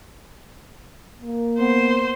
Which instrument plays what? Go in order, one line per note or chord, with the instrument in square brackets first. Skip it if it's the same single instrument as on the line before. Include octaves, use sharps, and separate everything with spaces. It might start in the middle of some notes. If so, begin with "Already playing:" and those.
[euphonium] A#3
[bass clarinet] B3 [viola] C5